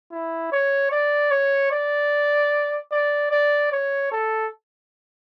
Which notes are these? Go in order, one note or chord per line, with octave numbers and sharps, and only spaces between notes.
E4
C#5
D5
C#5
D5
D5
D5
C#5
A4